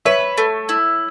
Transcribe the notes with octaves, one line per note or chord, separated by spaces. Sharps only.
B4 C#5 E5
A3
E4